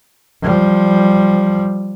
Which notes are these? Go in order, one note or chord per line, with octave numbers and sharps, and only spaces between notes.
F3 G3